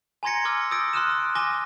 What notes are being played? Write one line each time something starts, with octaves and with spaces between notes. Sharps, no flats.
G#5 A#5 C6 G#6 A#6 C#7
G#5 C6 D6 E6 F6
D#6 E6 G6 A6 A#6 D7
C6 D#6 F6 F#6 D#7 E7
G#5 D6 A#6 D#7 E7 G7